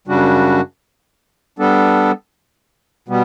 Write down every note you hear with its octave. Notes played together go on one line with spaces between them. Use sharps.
F#2 C#3 G3 D4 F#4
G3 B3 D4 A4
B2 G3 B3